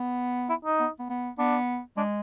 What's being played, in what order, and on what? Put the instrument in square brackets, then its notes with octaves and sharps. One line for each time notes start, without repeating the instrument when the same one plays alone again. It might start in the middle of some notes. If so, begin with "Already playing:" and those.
Already playing: [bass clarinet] B3
[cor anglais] E4
D#4
[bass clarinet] B3
B3
B3
[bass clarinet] B3 [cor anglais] D4
[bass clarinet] G#3 [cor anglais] D4